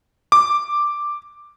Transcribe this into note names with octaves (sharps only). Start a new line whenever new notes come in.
D6